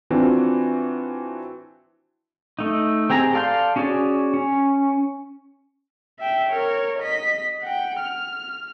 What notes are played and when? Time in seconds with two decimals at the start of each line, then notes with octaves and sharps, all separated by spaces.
0.10 E3 C4 D4 F4 F#4
2.59 A3 D#4
3.10 C4 G4 G#4 A#5
3.33 A4 D5 F5 C6 G6
3.76 C#4 F#4 G#4 C#5 D5
4.34 C#4
6.20 E5 G5
6.50 A#4 C#5
6.99 D#5 B6
7.62 F#5 G5
8.01 F6